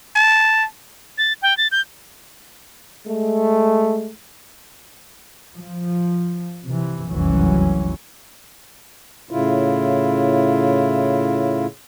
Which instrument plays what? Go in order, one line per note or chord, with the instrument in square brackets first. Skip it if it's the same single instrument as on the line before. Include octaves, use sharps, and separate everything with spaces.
[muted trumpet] A5
[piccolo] A6
G5
A6
G6
[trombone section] G#3 A3
[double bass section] F3
C3 E3
F1 C2 F#2 E3 F#3 C#4
[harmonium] A2 C#3 E4 F4